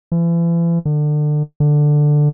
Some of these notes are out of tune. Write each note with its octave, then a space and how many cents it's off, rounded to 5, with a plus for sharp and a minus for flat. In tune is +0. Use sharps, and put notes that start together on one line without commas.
E3 +40
D3 +30
D3 +10